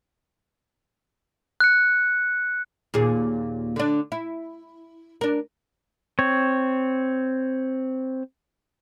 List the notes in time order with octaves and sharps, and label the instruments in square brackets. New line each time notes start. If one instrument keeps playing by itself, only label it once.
[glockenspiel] F#6 C#7
[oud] D#2 A#2 G#4
D3 D4
E4
D4 A#4
[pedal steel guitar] C4 C#5